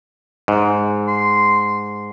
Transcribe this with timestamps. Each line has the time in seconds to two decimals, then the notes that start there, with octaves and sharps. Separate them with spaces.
0.48 G#2
1.08 C6